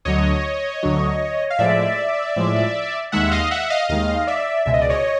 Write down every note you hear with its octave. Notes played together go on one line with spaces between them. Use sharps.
D2 D3 F#3 C#5 D#5
D2 D3 F#3
F5
A2 F3 G#3 D5 E5
A2 F3 G#3
D#2 D#3 G#3 E5 F#5
D#5 F5
E5 F#5
D#5 F5
D#2 D#3 G#3 D#5 F5
D5 E5
C#2 B2 G#3 E5
D#5
D5
C#5 D#5